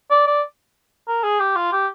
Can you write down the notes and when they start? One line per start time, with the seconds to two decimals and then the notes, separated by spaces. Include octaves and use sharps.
0.11 D5
0.27 D5
1.08 A#4
1.23 G#4
1.40 G4
1.56 F4
1.73 G4